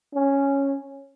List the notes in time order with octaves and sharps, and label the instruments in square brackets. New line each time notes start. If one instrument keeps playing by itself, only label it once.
[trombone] C#4